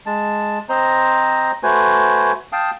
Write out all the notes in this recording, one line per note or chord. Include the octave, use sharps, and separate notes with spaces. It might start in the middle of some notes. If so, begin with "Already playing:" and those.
G#3 A5
C4 C5 D#5 A#5
A3 F#4 B4 C5 G#5
F5 G5 A5 D#6